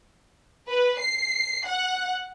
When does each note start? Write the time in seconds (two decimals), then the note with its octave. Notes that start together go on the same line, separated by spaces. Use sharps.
0.67 B4
0.98 C7
1.65 F#5